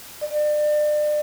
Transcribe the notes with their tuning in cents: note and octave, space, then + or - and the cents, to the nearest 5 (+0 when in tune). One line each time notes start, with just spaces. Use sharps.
D5 +35